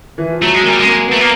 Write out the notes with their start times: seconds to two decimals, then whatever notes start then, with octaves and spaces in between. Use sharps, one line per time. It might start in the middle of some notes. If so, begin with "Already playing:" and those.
0.18 E3
0.30 F3
0.41 F#3 A3
0.55 G#3
0.63 G3 A#3
0.80 G#3
0.85 A#3
1.07 A3 B3
1.20 A#3